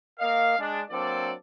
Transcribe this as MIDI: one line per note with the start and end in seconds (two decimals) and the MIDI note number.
0.19 0.56 58
0.19 0.56 70
0.19 0.56 75
0.19 0.56 77
0.59 0.81 56
0.59 0.81 62
0.90 1.33 54
0.90 1.33 58
0.90 1.33 60
0.90 1.33 62
0.90 1.33 69
0.90 1.33 74